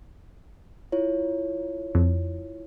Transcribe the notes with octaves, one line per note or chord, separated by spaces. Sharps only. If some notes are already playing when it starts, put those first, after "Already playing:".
E4 F4 C#5
F2